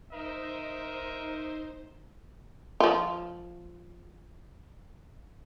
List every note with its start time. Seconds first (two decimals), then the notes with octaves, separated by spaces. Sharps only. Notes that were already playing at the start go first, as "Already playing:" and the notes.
0.12 D#4 A#4 C5 D#5 E5
2.80 F3 F4